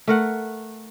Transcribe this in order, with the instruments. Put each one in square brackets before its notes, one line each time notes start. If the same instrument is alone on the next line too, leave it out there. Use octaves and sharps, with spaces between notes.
[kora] A3 A#4 F#5